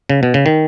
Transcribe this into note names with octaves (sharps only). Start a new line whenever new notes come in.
C#3
B2
C#3
D#3